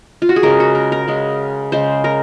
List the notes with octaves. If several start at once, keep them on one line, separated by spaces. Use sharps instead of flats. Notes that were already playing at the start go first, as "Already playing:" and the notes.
F4
F#4
G#4
C#3 G#3 A#4
F#4
A#4
A#4
C#3 G#3
C#3 G#3 C5
A#4